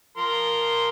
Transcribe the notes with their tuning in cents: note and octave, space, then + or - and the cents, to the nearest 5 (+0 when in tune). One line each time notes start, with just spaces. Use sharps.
F3 +0 A#4 +0 C6 +0